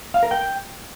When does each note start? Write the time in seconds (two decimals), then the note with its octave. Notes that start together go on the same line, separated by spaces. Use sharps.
0.14 F5
0.23 A#4
0.31 G5